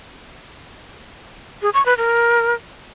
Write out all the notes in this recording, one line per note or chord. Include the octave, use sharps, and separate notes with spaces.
G#4
C#6
B4
A#4